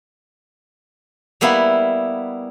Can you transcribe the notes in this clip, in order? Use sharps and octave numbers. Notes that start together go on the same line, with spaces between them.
G3 A#3 B3 E4